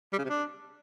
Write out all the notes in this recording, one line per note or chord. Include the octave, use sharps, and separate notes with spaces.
G3
C#3
C3
D4